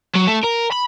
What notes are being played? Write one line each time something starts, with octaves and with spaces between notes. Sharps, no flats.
F#3
A3
A#4
B5